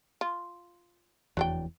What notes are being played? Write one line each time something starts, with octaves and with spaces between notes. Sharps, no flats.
F4
F1 E2 F#3 D4 G5